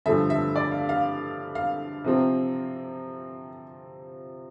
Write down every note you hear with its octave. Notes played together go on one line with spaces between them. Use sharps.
G2 D3 F3 A3 E5
E5
D5
F5
F5
F5
C3 F3 C4